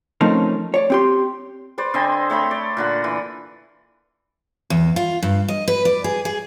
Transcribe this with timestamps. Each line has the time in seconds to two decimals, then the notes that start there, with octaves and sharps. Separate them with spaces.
0.21 F3 A3 C4 C#4 D#4 A#4
0.74 C#5 D5
0.90 C4 G4 C6
1.78 B4 C5 D5
1.94 D3 C4 D#5 G#5
2.30 A3 C#5 B5 C6
2.51 D5
2.77 A#2 D3 F#5
3.04 E3
4.70 E2
4.96 F4
5.23 G2
5.48 D#5
5.68 B4
5.85 D5
6.04 G#4
6.25 G#4